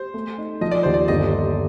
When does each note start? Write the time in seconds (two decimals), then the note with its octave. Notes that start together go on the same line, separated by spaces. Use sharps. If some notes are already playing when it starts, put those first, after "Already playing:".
Already playing: G4 C5
0.14 A3
0.38 D#4
0.61 F3 D#5
0.71 D5
0.83 D#2 C5
0.94 D5
1.08 G1 D#5